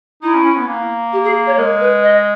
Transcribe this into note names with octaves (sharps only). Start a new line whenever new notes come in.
D#4 E4
C#4
C#4
B3
A#3
G4
G#4
C#5
G#3 A#4
B4
D#5